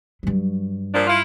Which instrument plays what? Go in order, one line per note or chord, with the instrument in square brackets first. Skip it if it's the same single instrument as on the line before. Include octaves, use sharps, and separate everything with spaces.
[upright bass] G2 F#3
[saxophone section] A#2 F3 D4
E4 F4